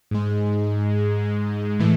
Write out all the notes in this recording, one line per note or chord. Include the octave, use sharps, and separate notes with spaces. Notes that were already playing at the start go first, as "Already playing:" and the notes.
G#2 G#3
A2 E3 G#3 A3